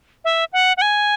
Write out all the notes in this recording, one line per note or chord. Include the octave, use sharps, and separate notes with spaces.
E5
F#5
F#5
G#5